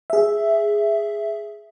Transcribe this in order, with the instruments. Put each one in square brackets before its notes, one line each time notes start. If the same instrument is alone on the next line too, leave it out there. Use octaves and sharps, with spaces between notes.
[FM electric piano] G#4 E5